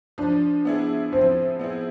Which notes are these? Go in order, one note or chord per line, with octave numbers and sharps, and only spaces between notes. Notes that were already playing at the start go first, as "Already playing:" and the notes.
F3 D4
B3 E4 G#4
F3 C4
B3 E4 G#4